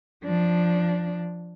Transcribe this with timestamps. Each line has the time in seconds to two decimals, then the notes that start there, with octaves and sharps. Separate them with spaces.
0.24 F3 D4